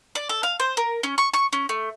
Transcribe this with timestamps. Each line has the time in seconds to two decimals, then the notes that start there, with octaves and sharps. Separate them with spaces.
0.15 D5
0.29 A4
0.43 F5
0.60 C5
0.77 A#4
1.03 C#4
1.18 C#6
1.33 C#6
1.53 C#4
1.69 A3